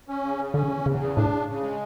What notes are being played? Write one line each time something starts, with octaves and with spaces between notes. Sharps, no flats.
C#4
C#3
C#3
D3 C#4
E2
E2 C#3
C#3
A2 D4
C#3
C#3
G#3